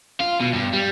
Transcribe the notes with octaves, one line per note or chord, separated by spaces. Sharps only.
F4
B2
G2
G3